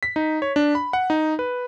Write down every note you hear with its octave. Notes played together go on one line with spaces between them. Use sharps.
B6
D#4
C#5
D4
B5
F#5
D#4
B4